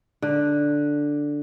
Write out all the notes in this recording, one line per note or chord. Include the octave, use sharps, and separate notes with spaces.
D3